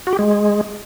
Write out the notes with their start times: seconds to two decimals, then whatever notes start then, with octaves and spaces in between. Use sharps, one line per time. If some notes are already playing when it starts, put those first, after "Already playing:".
0.07 F#4
0.13 G4
0.19 G#3